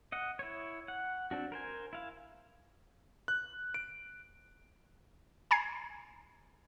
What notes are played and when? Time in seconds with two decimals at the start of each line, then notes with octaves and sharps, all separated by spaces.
0.12 D#5 F#5
0.39 E4 C#5
0.88 F#5
1.31 C4 D4 F#4
1.52 A#4 C5 G#5
1.93 E4 F5
3.28 F#6
3.74 D7
5.51 G#5 A#5 G#6 C7